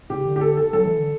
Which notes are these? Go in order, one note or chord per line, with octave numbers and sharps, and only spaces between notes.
C#3 G4
D3
G4
A4
A4
F#3 A4
E3
D3